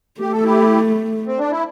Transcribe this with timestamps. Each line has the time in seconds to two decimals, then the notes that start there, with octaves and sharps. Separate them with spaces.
0.20 A3 G4
0.32 A4
0.44 E4 G4
1.27 C4
1.39 D4
1.51 E4